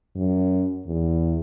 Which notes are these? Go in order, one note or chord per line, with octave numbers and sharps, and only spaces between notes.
F#2
E2